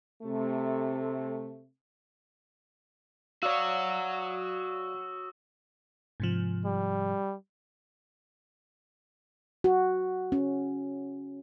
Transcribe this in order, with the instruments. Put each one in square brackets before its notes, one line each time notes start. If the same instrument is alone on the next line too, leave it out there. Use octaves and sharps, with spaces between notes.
[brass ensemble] C3 A3
[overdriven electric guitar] F#4 C#5 [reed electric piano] D5 F5 [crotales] C#6 D#6 E6
[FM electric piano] G#2 C3 F3
[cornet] G3
[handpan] F#4
C#4